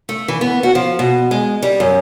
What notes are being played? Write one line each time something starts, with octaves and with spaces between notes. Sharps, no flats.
A3
E3
B3
F#4
F3
B2
G#3
G3
F#2